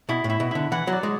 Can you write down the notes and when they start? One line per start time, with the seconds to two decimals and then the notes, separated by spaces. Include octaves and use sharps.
0.09 B2 E4
0.24 A2
0.30 E4
0.40 B2
0.51 D3 E4
0.72 E3 F#5
0.87 F#3
0.93 D5
1.03 G#3